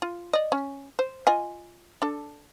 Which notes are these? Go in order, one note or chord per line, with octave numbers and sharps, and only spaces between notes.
F4
D5 D#5
C#4
C5
F4 D#5 G#5
D4 A4